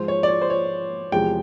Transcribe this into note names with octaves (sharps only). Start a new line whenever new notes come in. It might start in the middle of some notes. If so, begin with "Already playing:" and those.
Already playing: G#2 F3 G#3 C5
C#5
D5
C#5
C5
C#5
E2 C3 F3 G#3 G5